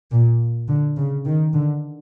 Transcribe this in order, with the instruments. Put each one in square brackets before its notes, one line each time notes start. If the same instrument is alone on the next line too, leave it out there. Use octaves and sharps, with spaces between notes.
[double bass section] A#2
D3
C#3
D#3
D3